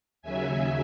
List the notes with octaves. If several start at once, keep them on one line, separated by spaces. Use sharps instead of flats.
D#2 C#3 F#3 E5 G#5